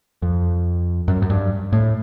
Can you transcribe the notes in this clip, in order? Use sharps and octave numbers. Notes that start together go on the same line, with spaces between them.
F2
F#2
F#2
G2
A2